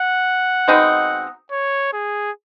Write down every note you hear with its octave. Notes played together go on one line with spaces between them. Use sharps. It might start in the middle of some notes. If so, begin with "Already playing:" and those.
Already playing: F#5
B2 G#3 C4 D#4
C#5
G#4